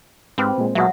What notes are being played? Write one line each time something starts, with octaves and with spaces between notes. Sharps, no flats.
G#2 C4 G4 B4 F5
A#2 G#3
B1 B2 F#3 E5 F#5